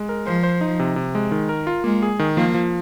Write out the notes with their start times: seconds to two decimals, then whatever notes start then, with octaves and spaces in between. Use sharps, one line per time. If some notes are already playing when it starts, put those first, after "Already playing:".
Already playing: G#3
0.09 A#4
0.26 F3 C5
0.43 C5
0.61 D#4
0.79 C3
0.96 C3
1.15 G#3
1.32 D#3
1.49 A#4
1.67 F4
1.84 G#3 A#3
2.02 G#4
2.19 D#3
2.37 F3 A#3
2.54 F3